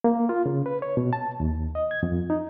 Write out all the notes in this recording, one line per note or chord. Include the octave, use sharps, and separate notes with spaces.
A#3
F4
C#3
B4
C#5
B2
A5
D#2
D#5
G#6
F2
D#4